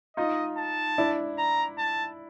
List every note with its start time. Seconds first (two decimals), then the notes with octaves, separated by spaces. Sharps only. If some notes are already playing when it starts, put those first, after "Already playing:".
0.17 D#4 F4 D#5
0.57 A5
0.98 D4 E4
1.38 A#5
1.78 A5